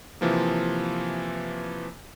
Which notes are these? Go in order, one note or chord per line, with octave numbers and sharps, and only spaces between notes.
C3 E3 F3 A#3